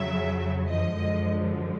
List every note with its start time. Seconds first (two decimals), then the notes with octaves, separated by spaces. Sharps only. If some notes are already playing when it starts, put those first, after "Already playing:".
Already playing: F2 C#3 F#3 E5
0.69 F#2 D3 F3 G#3 D#5